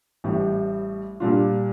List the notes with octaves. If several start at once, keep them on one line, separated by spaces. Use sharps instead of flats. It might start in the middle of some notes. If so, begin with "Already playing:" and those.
A1 A2 G3
A#2 G3 D4 F4